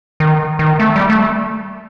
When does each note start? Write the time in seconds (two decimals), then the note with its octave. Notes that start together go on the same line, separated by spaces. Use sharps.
0.20 D#3
0.59 D#3
0.79 A3
0.96 G3
1.10 A3